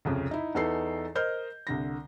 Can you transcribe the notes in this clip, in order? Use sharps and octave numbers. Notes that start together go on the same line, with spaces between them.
C2 F2 C#3
D#4 E4
E2 E3 D#4 A4 C7
A#4 C5 D#5 F6 G6
C2 D3 A#6